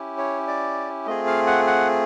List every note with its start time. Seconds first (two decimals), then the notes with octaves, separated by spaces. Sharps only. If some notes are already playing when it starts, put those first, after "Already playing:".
Already playing: C#4 E4 G4
0.18 C#5
0.48 D5
1.07 A3 C4 F4 G#4 D#5
1.27 F5
1.47 F#5
1.67 F#5